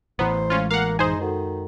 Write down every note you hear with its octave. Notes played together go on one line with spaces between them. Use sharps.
A1 E3 B3 C5 A#5
G#3 C#4 F4
A#3 F5 F#5
F#2 D#4 G#4 C5
D#3 F#4 A4 F#5